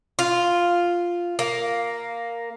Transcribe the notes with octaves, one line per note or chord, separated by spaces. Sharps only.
F4
A#3